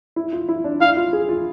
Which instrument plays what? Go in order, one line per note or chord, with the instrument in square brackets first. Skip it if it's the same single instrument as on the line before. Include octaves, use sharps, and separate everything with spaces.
[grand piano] E4
F4
E4
D4
[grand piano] E4 [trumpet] F5
[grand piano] F4
G#4
F4